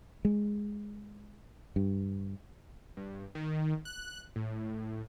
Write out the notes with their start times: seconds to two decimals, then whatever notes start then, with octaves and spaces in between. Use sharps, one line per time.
0.25 G#3
1.76 G2
2.97 G2
3.35 D#3
3.85 F#6
4.36 A2